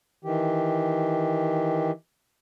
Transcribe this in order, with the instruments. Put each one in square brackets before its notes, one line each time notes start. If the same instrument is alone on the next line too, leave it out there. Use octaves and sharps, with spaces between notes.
[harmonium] D#3 E3 G4